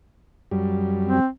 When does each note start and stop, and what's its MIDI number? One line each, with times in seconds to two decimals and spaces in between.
0.51 1.20 42
0.51 1.20 55
1.06 1.28 60